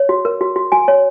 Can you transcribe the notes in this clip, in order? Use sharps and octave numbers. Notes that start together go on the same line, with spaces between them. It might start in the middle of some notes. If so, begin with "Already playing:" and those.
Already playing: C#5
F#4
A#4
F#4
F#4
F#4 G#5
C#5